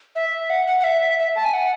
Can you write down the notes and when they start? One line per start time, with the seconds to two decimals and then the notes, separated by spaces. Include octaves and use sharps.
0.15 E5
0.50 F#5
0.67 F#5
0.80 F#5
0.84 E5
1.19 E5
1.36 A5
1.45 G#5
1.54 F#5